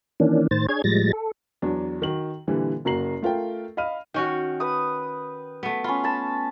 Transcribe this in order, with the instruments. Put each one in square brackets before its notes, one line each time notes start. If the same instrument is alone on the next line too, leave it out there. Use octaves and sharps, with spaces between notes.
[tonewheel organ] D#3 E3 A#3 C#4 D4
A2 D#3 C5 A6
D4 G#4 C#5 G#6
A2 F3 G3 G#3 A6 A#6
A4
[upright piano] E2 F#3 D4
D#3 F#4 F#7
A#2 D3 E3 G3
F#1 A#3 F#4 A#5 C7 F#7
A3 F4 A#4 G5
D#5 F5 B5 F6 D#7
[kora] D#3 C#4 F#4 [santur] G5
[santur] B4 D#6
[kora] A3 B3
[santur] C#4 B5 [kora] F4
[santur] A5 B5